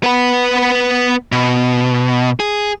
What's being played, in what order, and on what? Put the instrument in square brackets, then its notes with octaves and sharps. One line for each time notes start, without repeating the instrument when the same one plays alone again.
[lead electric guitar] B3 B4
B2
G#4